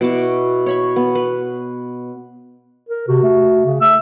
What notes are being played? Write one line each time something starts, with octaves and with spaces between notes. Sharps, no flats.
B2 E4 F#4 D6
C#5 B5 C#6
B3
B4
A#4
C3 F#4
A3
C#3
A3 E6